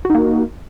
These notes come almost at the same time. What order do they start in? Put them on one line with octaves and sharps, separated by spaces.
F#4 D#4 A#3